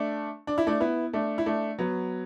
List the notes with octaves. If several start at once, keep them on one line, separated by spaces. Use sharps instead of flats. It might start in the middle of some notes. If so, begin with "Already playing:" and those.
Already playing: A3 D4
D4
E4
A3 D4
B3 E4
A3 D4
E4
A3 D4
F#3 B3